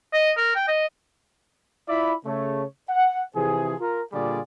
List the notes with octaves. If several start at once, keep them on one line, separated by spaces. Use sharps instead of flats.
D#5
A#4
G5
D#5
E4 F4 D5 E5 B5
C#3 A3 C#5
F#5
C3 E3 F3 G#4
F4 A#4
A#2 D3 G3 F4 G#4 D5